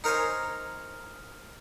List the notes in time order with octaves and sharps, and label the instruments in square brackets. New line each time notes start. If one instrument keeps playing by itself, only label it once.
[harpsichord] D#4 A#4 C5 C#5 G#5